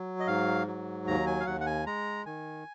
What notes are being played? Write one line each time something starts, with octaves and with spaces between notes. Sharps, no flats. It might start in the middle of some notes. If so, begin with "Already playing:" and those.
Already playing: F#3
D#5
G#2 F5
F#3
D#2 A#5
G#5
F5
D#2 F#5
F#5
G#5
G#3 A#5
D#3 G#5